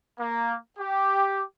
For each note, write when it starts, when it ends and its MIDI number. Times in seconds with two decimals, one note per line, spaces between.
0.20 0.56 58
0.79 1.43 67